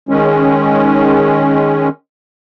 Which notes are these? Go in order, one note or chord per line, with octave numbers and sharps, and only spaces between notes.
D#3 G#3 C#4